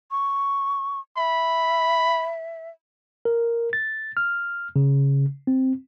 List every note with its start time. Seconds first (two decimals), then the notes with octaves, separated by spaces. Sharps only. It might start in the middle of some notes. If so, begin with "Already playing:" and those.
0.11 C#6
1.17 E5 B5
3.25 A#4
3.73 A6
4.17 F6
4.76 C#3
5.47 C4